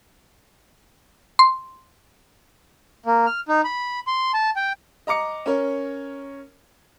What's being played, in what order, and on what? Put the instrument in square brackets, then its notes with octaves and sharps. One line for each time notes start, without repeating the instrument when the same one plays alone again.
[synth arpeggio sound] C6
[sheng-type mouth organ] A#3
F6
D#4
B5
C6
A5
G5
[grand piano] D#5 A#5 D6 C#7
C#4 A#4 C#5